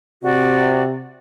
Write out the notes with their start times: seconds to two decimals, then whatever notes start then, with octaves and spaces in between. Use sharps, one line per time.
0.24 C3 F#4 D5